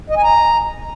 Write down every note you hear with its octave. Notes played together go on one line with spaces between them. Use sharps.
D#5
G#5
A#5